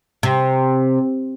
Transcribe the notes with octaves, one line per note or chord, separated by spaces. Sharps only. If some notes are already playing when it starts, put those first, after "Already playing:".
C3